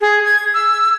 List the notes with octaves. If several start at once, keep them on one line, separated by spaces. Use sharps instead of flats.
G#4
G#6
E6